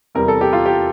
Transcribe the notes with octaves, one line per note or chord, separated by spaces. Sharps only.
E2 C3 G3 A#4
A4
G4
F4
G4